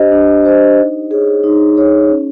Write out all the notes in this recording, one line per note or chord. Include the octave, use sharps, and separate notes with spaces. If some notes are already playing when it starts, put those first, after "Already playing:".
Already playing: D4 G4 C5 D#5
D4
G4 C5 D#5
D#4
G#4 C#5
D#4
G#4 C#5
C#4